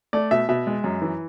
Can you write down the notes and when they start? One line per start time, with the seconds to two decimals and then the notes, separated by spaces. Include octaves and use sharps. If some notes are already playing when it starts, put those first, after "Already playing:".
0.13 A3 D5
0.31 B2 E5
0.49 B2 E5
0.67 G#3
0.84 F#2
1.02 E3